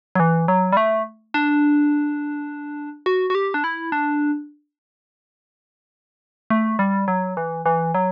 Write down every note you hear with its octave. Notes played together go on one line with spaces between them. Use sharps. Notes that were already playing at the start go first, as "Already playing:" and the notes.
F#3
E3
F#3
G3
A3
D4
F#4
F#4
G4
D4
E4
D4
A3
G3
F#3
E3
E3
F#3